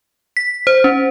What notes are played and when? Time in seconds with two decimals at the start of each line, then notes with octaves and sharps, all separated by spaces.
0.37 B6
0.67 C5
0.84 C#4